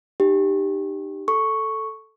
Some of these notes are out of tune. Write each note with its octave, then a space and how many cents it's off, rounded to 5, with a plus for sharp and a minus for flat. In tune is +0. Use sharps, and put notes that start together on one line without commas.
D#4 -35 G4 +0
A4 +0 C#6 +0